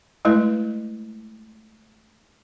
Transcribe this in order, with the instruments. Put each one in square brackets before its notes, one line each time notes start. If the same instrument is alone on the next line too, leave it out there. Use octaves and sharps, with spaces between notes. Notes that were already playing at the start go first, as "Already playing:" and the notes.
[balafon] G#3 A3 E4 B4